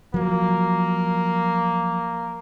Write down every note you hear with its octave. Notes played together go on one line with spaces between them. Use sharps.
F3 F#3 A#3